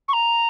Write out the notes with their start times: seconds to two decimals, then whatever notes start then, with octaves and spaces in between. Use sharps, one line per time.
0.08 C#6
0.13 A#5